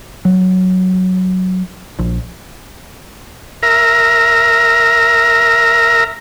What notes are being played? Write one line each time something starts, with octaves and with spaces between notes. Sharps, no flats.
F#3
A#1
A#4 E5 A#5